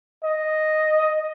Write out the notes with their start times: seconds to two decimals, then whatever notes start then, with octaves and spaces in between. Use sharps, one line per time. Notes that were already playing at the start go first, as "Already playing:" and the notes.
0.24 D#5